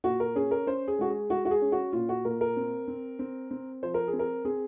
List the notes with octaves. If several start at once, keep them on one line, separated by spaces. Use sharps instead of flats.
A#2 F#4
A#4
C#4 G#4
A#4
C#4 C5
G#4
G#3 F#4
G#4
G#3 F#4
F#4
G#4
C#4
F#4
A#2 F4
F#4
A#2 A#4
A#4
C4
C4
C4
C4
F3 C5
A#4
G#4
C4
A#4
C4 G#4